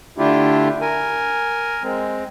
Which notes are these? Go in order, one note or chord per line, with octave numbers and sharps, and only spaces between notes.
D3 A3 D4 E4 F4 G4
A#4 G#5
G#3 C4